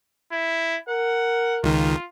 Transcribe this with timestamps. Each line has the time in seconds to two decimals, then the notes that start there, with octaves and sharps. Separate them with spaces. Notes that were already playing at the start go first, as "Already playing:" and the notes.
0.32 E4
0.89 A#4 F#5
1.64 C#2 D#3 F4